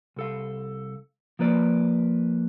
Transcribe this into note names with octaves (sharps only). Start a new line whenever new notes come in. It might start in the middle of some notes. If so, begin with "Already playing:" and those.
C2 A4 F5
F3 A#3 B4 D5